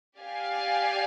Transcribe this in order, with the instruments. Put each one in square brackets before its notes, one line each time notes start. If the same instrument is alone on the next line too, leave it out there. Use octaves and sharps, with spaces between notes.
[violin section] G4 D5 F5 G#5